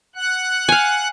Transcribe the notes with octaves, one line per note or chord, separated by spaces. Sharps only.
F#5 F#6
F5 G#5